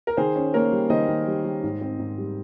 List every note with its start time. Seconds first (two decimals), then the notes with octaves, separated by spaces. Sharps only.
0.07 A#4
0.17 D#3 G#4 C5
0.36 C#4
0.54 A#3 A#4 C#5
0.72 G3
0.90 D#3 C5 D#5
1.08 D#3
1.27 G3
1.44 G3
1.64 G#2
1.81 C4
1.99 G#2
2.18 G3